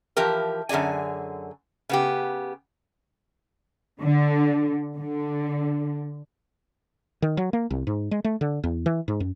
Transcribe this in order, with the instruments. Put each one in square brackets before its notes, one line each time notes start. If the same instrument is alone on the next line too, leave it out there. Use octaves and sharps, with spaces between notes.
[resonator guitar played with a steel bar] E3 F3 G4 A#4
F#2 D3 G#4 D5 G#5
C#3 B3 G4
[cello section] D3
D3
[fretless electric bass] D#3
F#3
A#3
C2
G#2
G#3
A3
D3
E2
E3
G#2
F#2